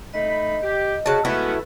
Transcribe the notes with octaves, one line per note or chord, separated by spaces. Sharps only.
A3 D#4 D#5 B5
G4
C#3 F#4 A5
G#3 A3 B3 C#4 E4 F#4 B4